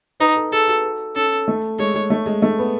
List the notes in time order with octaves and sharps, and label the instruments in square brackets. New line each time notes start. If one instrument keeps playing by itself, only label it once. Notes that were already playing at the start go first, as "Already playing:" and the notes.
[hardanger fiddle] D#4 [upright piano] B4
[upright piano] A4
[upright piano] G#4 [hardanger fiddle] A4
[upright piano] F#4
[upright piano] C#4 [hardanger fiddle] A4
[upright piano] A3
[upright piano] G#3 [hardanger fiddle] C#5
[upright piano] G#3
A3
G#3
A3
B3